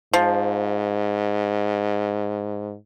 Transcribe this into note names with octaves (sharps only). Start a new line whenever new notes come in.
G#2 F3